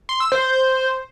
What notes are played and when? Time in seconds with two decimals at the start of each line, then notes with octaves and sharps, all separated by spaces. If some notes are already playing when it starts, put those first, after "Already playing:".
0.09 C6
0.20 E6
0.32 C5